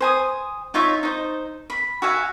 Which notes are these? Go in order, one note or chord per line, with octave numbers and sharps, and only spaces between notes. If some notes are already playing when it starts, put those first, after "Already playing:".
C5 G#5 D#6
D#4 F4 C#5 E5
D#4 C5
B5
F#4 E5 F5 G#5